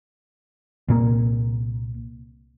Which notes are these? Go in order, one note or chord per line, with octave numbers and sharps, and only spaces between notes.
C2 A#2 A#3